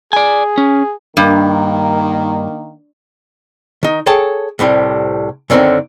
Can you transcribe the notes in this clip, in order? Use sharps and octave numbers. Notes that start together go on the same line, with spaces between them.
G#4 D5 G#5
C#4
G2 D#3 A#3
D#3 D#4
G#4 A4 C#5 G5 A5
C2 A2 C3 G3
F#2 D3 D#3 A3 C4 D#4